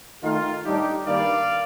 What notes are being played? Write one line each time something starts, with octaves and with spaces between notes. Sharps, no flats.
D#3 A3 D#4 F4
A2 G3 D4 D#4 G4
G2 D#3 G3 A#3 D5 F5